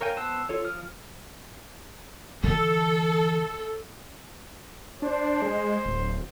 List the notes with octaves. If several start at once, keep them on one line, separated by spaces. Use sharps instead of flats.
A#4 C#5 F5 G5 G#5
B3 C5 A5 E6 F#6
F4 A4 C#5
F3 D#6 F6
D3 E3 A4
D4 C5
G#3
D1